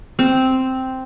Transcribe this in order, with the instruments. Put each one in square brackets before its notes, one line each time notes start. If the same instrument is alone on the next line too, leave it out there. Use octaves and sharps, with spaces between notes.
[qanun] C4